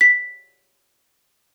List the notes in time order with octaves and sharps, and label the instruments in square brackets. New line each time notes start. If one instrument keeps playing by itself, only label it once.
[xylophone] B6